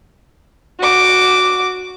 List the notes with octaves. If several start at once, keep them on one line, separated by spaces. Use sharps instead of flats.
F#4 D6